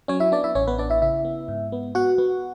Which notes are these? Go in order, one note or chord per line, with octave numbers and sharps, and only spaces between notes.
F#3 C#4 C#5
E4 E5
B3 D4 D5
E4 E5
A1 C#4 C#5
B3 B4
B3 D4 D5
E4 E5
C#3 E4 E5
B3
G#2
B3
B3 F#4 F#5
B3